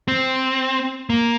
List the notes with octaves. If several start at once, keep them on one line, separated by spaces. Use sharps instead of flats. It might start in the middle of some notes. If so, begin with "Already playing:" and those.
C4
A#3